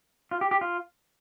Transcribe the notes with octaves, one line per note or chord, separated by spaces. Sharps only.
F4
G4
G4
F4